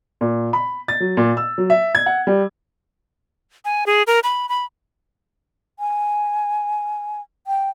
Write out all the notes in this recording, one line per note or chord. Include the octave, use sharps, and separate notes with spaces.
A#2
B5
A6
F#3
A#2
E6
F#3
E5
G#6
F#5
G3
G#5
G#4
A#4
B5
B5
G#5
G5